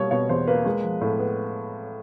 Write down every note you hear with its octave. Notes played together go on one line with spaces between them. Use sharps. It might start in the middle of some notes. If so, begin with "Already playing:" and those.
Already playing: B2 G3 A#3 C#5
B2 C#5
E2 C5
A#3 B4
G#3
F3
A2
B3